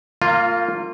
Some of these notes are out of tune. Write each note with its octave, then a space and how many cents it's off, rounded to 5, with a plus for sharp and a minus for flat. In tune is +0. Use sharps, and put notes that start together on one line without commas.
A#3 -30 F4 +0